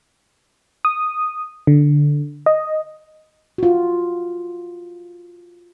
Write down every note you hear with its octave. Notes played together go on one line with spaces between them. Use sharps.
D#6
D3
D#5
F4 F#4